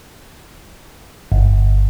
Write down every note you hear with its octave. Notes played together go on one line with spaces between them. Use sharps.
G1